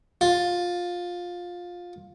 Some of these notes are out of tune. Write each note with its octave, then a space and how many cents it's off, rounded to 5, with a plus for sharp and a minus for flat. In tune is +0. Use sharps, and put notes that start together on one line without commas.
F4 +15